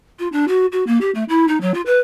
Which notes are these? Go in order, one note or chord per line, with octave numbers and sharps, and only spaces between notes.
F4
D4
F#4
F#4
A#3
G4
A3
E4
D#4
F#3
F4
B4